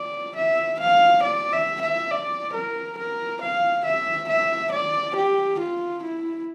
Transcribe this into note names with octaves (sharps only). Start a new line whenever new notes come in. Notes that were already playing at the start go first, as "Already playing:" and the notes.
Already playing: D5
E5
F5
D5
E5
E5
D5
A#4
A#4
F5
E5
E5
D5
G4
F4
E4